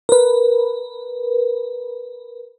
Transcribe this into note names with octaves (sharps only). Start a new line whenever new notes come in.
A#4 B4